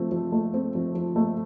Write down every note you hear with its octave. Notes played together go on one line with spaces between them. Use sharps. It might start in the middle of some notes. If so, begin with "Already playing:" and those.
Already playing: F3 A3 C4
F3
A3
C4
F3
F3
A3